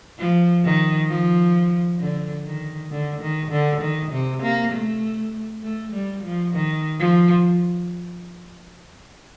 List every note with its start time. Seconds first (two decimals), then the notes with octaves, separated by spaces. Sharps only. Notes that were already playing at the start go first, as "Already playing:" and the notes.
0.19 F3
0.65 D#3
1.09 F3
2.00 D3
2.46 D#3
2.91 D3
3.22 D#3
3.51 D3
3.81 D#3
4.12 C3
4.43 A#3
4.73 A3
5.63 A3
5.93 G3
6.24 F3
6.54 D#3
6.99 F3